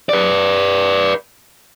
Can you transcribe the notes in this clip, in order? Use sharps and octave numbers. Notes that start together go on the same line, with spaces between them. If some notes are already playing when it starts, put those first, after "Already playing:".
B4 D5